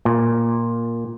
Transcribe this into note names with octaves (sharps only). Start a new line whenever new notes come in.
A#2